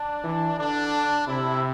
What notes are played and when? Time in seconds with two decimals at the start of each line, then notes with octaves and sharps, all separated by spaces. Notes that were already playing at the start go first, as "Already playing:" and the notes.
Already playing: D4
0.24 E3
0.58 D3 D4
1.27 C3 E4